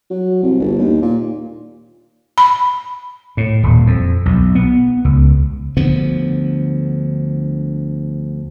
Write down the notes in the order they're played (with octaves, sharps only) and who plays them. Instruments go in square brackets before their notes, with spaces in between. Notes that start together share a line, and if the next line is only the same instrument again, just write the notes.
[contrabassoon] F#3
C2
G1
D#2
A#2
[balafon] B5
[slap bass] A2
D#1
F2
B1
B3
C#2
D2 D3 F3 B3